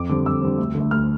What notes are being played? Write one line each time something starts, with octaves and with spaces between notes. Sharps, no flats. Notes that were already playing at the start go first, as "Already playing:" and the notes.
Already playing: F2 D6
D3 G3 C4
F2 E6
D3 G3 C4
D2
D3
A3
D2 F6